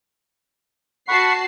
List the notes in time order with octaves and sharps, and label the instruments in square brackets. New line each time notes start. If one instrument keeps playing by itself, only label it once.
[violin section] F#4 A5 C7 [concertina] F#5 B5 C#6